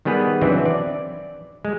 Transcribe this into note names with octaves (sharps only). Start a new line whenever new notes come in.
D#3 G3 B3 G#4 B4
E3 F#3 C4 D4 E4
D5
G#3